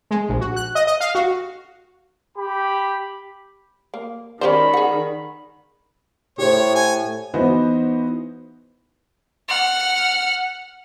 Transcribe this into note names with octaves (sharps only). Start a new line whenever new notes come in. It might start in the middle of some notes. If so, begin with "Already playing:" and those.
G#3
A#1
F#4
F#6
D#5
D#5
F5
F#4
G4 B5
A#3
D#3 C#4 G4 C5 D5 B5
G#4 F#5
A2 G4 C5 C#5
G#5
E3 B3 D#4 F#4 C5
F#5 F6